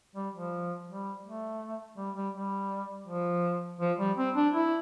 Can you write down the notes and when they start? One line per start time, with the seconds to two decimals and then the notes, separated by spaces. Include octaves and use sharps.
0.16 G3
0.34 F3
0.88 G3
1.25 A3
1.98 G3
2.16 G3
2.35 G3
3.07 F3
3.80 F3
3.99 G3
4.17 C4
4.35 D4
4.53 E4